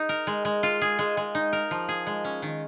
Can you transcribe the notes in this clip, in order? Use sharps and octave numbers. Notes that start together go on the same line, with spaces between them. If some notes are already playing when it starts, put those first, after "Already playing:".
Already playing: D#4 G#4
A#4
G#3
G#3
F4
G#4
G#3
G#3
D#4
A#4
F3
G#4
G#3
C#4
D#3